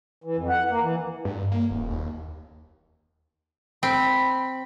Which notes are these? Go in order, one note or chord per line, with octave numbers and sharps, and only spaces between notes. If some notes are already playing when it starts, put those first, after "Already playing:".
E3
F2
F#5
A#3
E3
G2
A#3
D#1
D#2
C4 B5